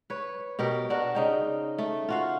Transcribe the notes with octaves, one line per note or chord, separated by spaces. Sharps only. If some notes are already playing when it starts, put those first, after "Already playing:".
B4 C#5
B2 G4 A#4
D4 F#4 A#4
C#3 D#4 G5
A3
F4 F#4 F5